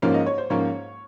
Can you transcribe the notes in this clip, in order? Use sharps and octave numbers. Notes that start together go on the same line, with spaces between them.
G#2 F3 A#3 C#4 F5
D#5
C#5
C5
G#2 F3 A#3 C#4 C#5